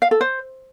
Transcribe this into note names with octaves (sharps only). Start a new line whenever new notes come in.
F5
A4
C5